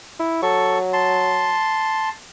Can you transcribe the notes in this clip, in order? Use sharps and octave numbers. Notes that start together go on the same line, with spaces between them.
E4
F#3 A4 C#6
A5 C6